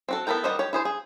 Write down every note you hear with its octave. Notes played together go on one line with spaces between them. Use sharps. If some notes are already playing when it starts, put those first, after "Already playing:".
C4 F#4 A4
B3 E4 A4 A#4 G5
D#3 G3 C5 D#5 F#5
G4 C#5
E4 G#4 C5
G#4